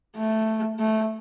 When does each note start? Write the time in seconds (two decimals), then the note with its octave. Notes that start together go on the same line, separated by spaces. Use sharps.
0.17 A3
0.79 A3